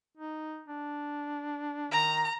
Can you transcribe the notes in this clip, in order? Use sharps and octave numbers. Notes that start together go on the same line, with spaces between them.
D#4
D4
D#3 A#5